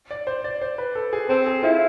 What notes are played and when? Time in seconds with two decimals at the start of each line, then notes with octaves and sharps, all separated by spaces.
0.11 D5
0.27 C5
0.44 D5
0.62 C5
0.78 B4
0.95 A4
1.13 G#4
1.29 C4 A4
1.46 G#4
1.63 E4 F4